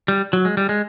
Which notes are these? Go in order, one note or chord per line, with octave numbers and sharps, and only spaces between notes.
G3
F#3
G#3
G3
G#3